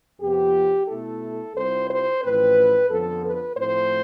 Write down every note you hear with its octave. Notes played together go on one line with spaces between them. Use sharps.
F2 C3 F3 B3 G4
B2 A3 E4 A4
C2 C3 G3 C4 F4 C5
C5
A1 A2 F3 C4 B4
F2 D3 F3 B3 A4
B4
A2 F3 A3 C4 C5